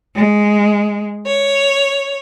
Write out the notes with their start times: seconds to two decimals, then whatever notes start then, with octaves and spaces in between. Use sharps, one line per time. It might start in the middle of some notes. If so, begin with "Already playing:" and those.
0.15 G#3
1.26 C#5